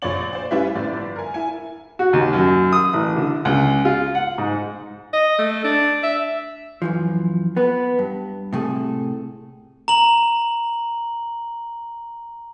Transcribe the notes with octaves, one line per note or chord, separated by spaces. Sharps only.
A#1 F3 C#5 D5 F#7
C5 D5
G3 C#4 E4 F4 B4 E5
G1 A2 F3 D5
A#4 G#5
E4 G#5
F#4
D#2
F#2
D#6
A1
D3
C#2
F4
F#5
G#2
D#5
A3
D4
E5
F#2 E3 F3
B3 B4
G2
A2 C3 A3 G#4 A4
A#5 F#7